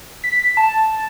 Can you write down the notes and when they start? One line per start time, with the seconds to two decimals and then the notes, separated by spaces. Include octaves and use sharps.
0.24 B6
0.57 A5